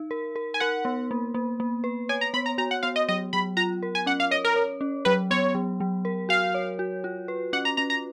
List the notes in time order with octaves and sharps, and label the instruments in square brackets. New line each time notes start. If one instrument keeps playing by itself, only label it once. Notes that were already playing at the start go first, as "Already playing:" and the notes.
Already playing: [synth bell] D#4
A#4
A#4
[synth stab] G#5
[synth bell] A#4 [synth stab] F#5
[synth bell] B3
A#3
A#3
A#3
B4
[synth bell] C#5 [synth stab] G#5
[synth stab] A#5
[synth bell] B3 [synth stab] B5
[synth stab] A#5
[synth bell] F#4 [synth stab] A#5
[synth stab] F#5
[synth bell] B3 [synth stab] F5
[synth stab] D#5
[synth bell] F#3 [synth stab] D#5
[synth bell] F#3 [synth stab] B5
[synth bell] F4 [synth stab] A#5
[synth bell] A#4
[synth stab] G#5
[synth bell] C#4 [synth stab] F#5
[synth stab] F5
[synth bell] C#5 [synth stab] D#5
[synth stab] A#4
[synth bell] C#5
C#4
[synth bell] F#3 [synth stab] B4
[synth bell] B3 [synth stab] C#5
[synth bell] F#3
F#3
A#4
[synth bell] F#4 [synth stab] F5
[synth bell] C#5
F#4
F4
B4
[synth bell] C#4 [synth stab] F#5
[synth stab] A#5
[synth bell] C#4 [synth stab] A#5
[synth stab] A#5